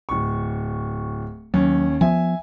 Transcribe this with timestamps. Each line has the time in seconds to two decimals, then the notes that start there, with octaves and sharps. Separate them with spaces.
0.09 D1 C#6
1.54 D#2 F#3 C#4
2.01 F3 B3 E5 G#5